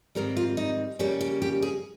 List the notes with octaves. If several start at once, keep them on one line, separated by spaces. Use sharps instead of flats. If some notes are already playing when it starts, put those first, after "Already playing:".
G#2 D#3 G3 C4 A#4
F4
D#4
C#3 G3 A#3 C#4 G4
G4
G4
G#4